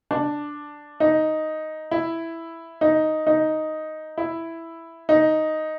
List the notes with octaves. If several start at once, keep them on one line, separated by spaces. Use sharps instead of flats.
D4
D#4
E4
D#4
D#4
E4
D#4